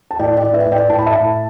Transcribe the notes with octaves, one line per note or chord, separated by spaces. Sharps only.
A5
A2 D5 G5
D5 G5
A2
B4 E5
A2
D5 G5
A2 A5
B5
E5 A5
A2